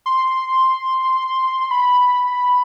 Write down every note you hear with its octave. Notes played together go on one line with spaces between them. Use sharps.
C6
B5